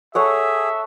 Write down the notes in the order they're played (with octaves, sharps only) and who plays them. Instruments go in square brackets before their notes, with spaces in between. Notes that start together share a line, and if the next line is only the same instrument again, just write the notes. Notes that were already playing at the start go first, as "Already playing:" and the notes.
[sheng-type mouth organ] G#4 [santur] A4 C#5 F#5 [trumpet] E5